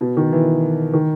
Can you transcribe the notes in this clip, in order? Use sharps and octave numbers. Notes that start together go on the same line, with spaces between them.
B2
D#3
E3
D#3